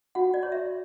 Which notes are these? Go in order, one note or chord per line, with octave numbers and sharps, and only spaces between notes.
F#4 F#5
D5
C#5
E5